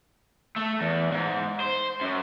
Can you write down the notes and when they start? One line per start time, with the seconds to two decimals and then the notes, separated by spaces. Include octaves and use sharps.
0.56 A3
0.81 E2
1.12 G#2
1.60 C5
2.01 F#2